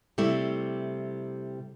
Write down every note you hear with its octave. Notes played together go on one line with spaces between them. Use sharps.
C3 G3 A3 E4